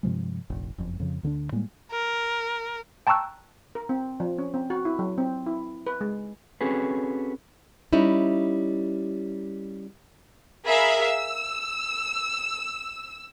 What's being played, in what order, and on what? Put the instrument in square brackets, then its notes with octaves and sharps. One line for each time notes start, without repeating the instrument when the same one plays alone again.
[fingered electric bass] G2 C3 F3 G#3
F1 A#1
F#1 F2
F2 C#3 F3
D2 D3 C#4 D4
A2 G3 G#3 A#3
[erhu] A#4
[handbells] G5 A5 A#5 C#6 E6 F#6
[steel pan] A#4
C4
F3
C#4
C4
F#4
E4
F#3
C4
E4
B4
G#3
[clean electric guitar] C4 C#4 F#4 G#4 A4 B4
[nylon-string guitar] G3 C#4 D#4 E4
[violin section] G#4 A#4 E5 F5 B5
E6